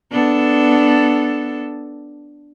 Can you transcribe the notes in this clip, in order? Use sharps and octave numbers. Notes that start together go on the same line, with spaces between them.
B3 D4 A4